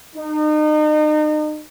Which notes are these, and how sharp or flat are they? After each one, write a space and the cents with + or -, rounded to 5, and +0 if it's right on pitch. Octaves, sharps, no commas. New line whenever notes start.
D#4 -35